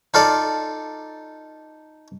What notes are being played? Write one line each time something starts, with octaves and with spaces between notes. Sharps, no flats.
D#4 F4 A4 D5